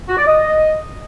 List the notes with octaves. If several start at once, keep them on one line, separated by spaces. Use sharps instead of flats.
F#4
D5
D#5